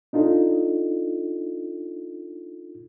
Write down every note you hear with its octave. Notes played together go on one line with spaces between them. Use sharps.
D4 D#4 F4 A4